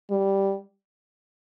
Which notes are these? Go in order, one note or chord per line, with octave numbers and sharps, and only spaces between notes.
G3